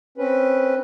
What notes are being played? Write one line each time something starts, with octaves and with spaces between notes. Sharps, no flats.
C4 C#4 B4